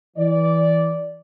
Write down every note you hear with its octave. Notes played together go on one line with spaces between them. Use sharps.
E3 D5